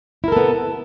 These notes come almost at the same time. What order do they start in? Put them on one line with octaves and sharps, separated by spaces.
E4 A#4 A4 B3